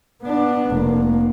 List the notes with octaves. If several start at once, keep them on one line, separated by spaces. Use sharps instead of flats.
B3 D4
F1 A#3